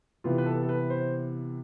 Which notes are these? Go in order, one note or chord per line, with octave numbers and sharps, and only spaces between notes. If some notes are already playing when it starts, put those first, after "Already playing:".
C3 E3 B3 F4
B4
A4
A4
B4
C5